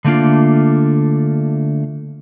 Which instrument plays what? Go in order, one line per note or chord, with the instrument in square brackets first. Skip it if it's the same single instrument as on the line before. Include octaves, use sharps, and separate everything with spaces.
[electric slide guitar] D3 A3 A#3 D4 F4